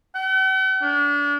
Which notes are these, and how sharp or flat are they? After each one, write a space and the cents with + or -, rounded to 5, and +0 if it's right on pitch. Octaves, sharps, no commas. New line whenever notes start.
F#5 +45
D4 -30